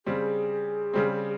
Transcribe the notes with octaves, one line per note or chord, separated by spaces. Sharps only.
C#3 G3 C4 G#4
C#3 G3 C4